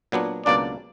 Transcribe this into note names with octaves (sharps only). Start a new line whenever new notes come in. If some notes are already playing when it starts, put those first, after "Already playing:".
A#2 F#3 B3 D4
C#2 B2 F#3 A#3 D4 D5